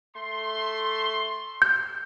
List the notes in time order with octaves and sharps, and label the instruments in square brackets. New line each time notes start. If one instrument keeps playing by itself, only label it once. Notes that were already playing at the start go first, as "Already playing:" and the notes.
[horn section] A3 C6
[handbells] G6